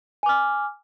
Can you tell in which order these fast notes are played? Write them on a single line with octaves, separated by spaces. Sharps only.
G#5 D6 F6